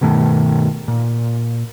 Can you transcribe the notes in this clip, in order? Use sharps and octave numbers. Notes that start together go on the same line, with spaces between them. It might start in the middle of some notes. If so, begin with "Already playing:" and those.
G2 B2 D#3 A3
A#2